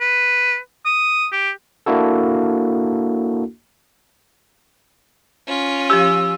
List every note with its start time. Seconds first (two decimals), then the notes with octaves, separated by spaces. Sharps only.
0.01 B4
0.85 D#6
1.32 G4
1.86 A#3 D4 E4 F#4 A4
5.48 C#4 F4
5.90 F3 G4 E6